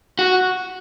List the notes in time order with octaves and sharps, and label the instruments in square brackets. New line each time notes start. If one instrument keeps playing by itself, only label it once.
[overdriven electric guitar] F#4